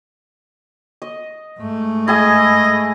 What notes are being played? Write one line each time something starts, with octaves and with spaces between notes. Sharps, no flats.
D#5
G#2 A3
E4 G#4 D#5 G#5